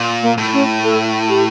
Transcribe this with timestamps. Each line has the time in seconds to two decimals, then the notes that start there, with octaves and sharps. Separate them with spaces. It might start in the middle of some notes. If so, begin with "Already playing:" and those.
Already playing: A#2
0.22 A#3
0.38 A2
0.53 C#4
0.83 A4
1.29 G4